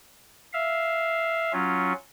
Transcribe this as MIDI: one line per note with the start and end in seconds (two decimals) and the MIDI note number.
0.53 1.52 76
0.53 1.52 77
1.53 1.93 54
1.53 1.93 61
1.53 1.93 65